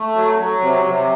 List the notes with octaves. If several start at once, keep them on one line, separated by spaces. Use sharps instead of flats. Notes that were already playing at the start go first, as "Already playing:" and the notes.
Already playing: A3
F#3
F#3
C3
C3